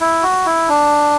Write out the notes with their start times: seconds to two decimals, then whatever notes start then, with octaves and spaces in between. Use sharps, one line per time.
0.01 E4
0.23 F#4
0.46 E4
0.69 D4